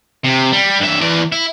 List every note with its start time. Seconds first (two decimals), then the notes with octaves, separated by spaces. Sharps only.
0.25 C3
0.53 G3
0.81 G2 E5
1.01 E3 D5
1.32 E4